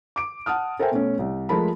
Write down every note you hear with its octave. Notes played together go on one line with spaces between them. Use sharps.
D6 D7
F#5 A5 D#6 F6
A4 A#4 C5 E5 G5 G#5
B2 A3 C#4
C2
F3 G#3 A3 A#4 A5 B5